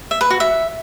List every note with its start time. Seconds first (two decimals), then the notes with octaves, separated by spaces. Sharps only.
0.11 E5
0.21 B4
0.30 F#4
0.40 E5